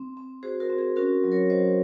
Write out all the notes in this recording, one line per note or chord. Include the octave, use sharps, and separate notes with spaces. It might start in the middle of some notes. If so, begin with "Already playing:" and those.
Already playing: C4
C4
F#4 G#4 C5
F#4 A#4
C4
G#4
C#4 F#4 A#4
F#3
A#4 C#5
F#3 C5 D#5